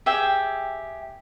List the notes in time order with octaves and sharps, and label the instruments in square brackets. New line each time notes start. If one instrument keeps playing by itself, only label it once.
[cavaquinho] G4 G#4 E5 G5